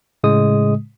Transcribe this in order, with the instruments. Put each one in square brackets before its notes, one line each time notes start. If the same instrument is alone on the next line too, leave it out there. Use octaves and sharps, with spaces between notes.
[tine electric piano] A2 C#3 G#3 D#6